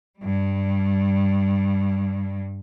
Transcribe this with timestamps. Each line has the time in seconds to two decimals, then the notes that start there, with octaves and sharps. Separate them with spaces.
0.19 G2 G3